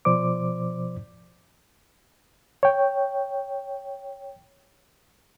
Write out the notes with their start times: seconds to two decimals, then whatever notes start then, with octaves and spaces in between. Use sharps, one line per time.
0.05 B2 F3 C5 D5 D6
2.63 C#5 G5